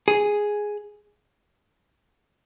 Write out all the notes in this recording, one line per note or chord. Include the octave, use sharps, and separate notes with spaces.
G#4